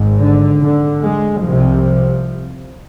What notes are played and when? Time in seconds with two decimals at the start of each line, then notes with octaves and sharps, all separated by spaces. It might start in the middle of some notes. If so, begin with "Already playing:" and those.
Already playing: G#1 G#2
0.21 D3
0.62 D3
1.03 G#3
1.43 C2 C3 F3